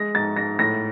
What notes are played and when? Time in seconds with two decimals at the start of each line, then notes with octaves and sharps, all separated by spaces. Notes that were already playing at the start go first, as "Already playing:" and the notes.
Already playing: G#3 A#6
0.15 G#2 A6
0.36 G#2 A#6
0.59 A2 A#6